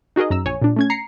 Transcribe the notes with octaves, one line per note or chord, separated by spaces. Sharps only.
D#4 F#4 G#4 A#4 D#5
F#2 A#5 E6
A#1 C#5 G#5
A#2 D4
A3 C#4 G#6
A#5 C7 C#7